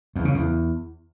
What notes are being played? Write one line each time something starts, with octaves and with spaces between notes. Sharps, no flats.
E2
C#3
E2